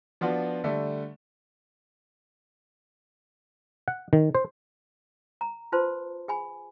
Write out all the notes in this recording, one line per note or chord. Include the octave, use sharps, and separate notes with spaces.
F3 B3 D4 F4 F#4
D3 G3 A3
F#5
D#3
C5
A#5
F4 B4 C5 A5 C6
G#4 G#5 B5